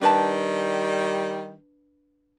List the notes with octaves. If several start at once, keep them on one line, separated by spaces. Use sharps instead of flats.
D#3 G3 D4 B4 A5